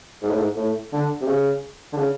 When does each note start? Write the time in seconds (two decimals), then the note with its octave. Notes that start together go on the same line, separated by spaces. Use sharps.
0.23 G#2
0.30 A2
0.39 G#2
0.56 A2
0.93 D3
1.21 C3
1.27 C#3
1.93 D3
1.97 C#3